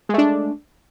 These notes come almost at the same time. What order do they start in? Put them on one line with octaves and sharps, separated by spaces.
G#3 A3 D4